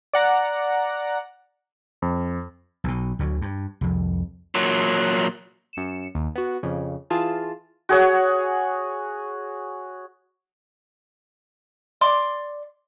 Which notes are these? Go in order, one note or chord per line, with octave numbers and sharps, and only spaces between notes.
D5 F#5 A#5
F2
B1 B2
D2 D3 F#3
G2
C2 F2
A#2 F#3
F#2 C#7 E7
D#2
B3 F#4
F2 C#3
E3 F4 G#4 A5
F#4 G#4 C#5 F#5
D5 C6 D6